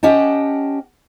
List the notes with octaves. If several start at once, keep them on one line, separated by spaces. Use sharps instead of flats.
C#4 G4 D#5 F#5 G5 A5